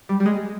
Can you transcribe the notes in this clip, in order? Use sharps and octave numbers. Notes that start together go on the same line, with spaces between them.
G3
G3
G#3